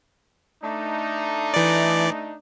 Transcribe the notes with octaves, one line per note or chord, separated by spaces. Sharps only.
A3 D4 D#4
E3 D5